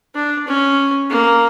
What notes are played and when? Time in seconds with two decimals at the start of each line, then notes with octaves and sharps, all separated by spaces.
0.15 D4
0.47 C#4
1.10 A#3